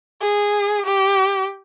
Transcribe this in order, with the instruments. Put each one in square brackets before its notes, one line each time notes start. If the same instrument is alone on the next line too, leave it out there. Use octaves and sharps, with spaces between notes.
[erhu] G#4
G4